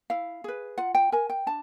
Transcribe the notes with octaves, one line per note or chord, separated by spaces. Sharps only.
E4 F5
G#4 B4
F4 F#5
G5
A#4 G#5
G5
D4 A5